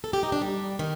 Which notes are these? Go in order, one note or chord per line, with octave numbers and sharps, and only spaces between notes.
A4
G4
D#4
D4
G3
D#3